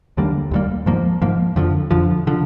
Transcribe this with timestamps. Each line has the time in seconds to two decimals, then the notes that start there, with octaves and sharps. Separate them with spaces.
0.17 D#2 D3 G3 A#3
0.51 D#2 D3 G3 A#3
0.86 G#2 F3 A#3
1.22 G#2 F3 A#3
1.56 F2 D3 F3
1.91 F2 D3 F3
2.27 D3 F3